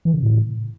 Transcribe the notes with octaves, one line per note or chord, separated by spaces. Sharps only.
E3
C#3
A2